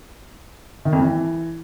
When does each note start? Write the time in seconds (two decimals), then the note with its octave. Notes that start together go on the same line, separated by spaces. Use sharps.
0.85 D#3
0.93 F2
1.00 E3